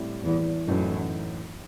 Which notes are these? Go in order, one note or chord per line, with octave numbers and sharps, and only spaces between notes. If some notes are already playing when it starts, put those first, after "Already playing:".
Already playing: A2 G3 C4 E4 G4
E2
F#2 A2 E3 A3 D#4